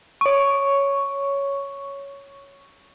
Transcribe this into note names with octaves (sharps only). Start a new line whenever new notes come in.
C#5 C#6